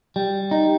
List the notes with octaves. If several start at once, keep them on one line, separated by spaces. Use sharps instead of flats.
G3
D#4